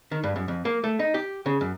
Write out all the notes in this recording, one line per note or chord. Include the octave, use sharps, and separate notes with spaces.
D#3
G2
F#2
F2
A#3
A3
D#4
G4
C#3
F#2